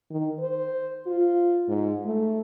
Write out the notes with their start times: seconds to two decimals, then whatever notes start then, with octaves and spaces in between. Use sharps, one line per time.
0.11 D#3
0.40 C5
1.07 F4
1.68 G#2
2.05 A3